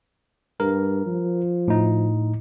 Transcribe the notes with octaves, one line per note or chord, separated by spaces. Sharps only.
G2 A#4
F3
A2 D#4